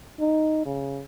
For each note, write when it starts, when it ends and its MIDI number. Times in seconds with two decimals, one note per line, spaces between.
0.20 0.63 63
0.66 1.02 49